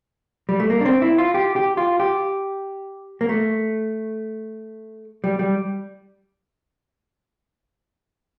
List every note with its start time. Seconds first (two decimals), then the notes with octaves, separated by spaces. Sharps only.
0.49 G3
0.60 A3
0.70 A#3
0.81 D4
0.85 C4
1.02 E4
1.18 F4
1.34 G4
1.56 G4
1.77 F4
2.00 G4
3.21 A#3
3.29 A3
5.24 G3
5.39 G3